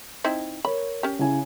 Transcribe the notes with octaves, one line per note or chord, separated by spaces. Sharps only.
C4 D#4 E4
A#4 C#5 B5
C#4 G4
C#3 E4 G#5